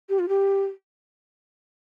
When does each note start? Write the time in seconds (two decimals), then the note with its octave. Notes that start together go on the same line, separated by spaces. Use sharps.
0.09 G4
0.19 F4
0.29 G4